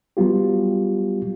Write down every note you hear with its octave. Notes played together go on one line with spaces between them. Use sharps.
F#3 G3 B3 F4 G4